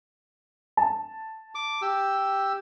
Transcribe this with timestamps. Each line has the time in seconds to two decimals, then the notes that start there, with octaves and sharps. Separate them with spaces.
0.77 A5
1.55 D6
1.82 G4 E6